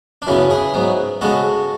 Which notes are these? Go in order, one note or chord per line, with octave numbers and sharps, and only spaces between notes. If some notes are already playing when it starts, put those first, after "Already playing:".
D4
F#2 C#3 E3 B3 C#4 E4
E4 G#4
G#2 F#3 B3
C#3 G#3 B3 F#4 A4